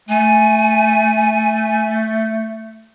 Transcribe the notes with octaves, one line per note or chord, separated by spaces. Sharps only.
A3 G#5